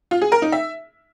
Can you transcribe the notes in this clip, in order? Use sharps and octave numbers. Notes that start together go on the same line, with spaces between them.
F4
G#4
A#4
D#4
E5